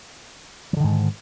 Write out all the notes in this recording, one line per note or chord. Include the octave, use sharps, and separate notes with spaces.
G#2 D3 D#3 F3